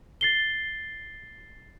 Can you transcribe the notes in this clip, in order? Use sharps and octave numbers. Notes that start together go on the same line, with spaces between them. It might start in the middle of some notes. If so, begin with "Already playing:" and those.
A6 C7 G7